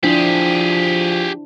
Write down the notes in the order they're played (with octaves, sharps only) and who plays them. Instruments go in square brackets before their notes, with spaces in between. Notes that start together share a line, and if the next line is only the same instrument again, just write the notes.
[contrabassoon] F3 [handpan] D4 E4 C5 [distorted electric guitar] G4 G#4